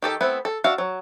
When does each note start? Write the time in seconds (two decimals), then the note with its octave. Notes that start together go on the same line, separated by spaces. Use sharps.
0.02 D#3 G4 A4
0.21 A3 B3 C4 E4 B4
0.45 A4
0.64 D4 F#4 E5 F5
0.78 F#3